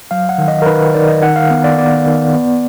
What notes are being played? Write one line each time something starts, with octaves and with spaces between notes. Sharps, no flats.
F#3 F5
F#5
D#3
D#5
A#4
D#3 B4
D#3 D5
D#5
D#3 F#5
F5
B3
D5
B3 D5
D#3
B3